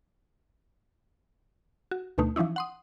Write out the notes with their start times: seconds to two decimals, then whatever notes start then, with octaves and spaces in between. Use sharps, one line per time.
1.91 F#4
2.18 D2 B2 A3 D#4
2.36 E3 F3 C#4 D#4 E4
2.56 F#5 C6 D#6